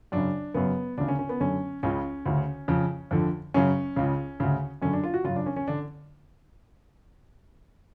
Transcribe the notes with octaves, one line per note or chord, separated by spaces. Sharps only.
F#2 C#3 D4
F#2 C#3 B3
D2 C#3 D4
C#4
C#4
B3
F#2 D3 C#4
C#2 C#3 C#4
D2 C#3
F2 C#3
F2 D3
F#2 C#3 C#4
C#2 C#3
D2 C#3
F#2 D3 C#4
D4
F4
F#4
F#2 C#3 F4
D4
C#4
C#4
D3 D4